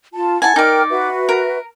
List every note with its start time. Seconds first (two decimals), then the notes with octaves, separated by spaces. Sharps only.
0.14 F4 A5
0.42 E4 F#5 G#5 A5
0.56 D#4 A#4 D5 G5 F6
0.90 F#4 B4 E5
1.29 A#4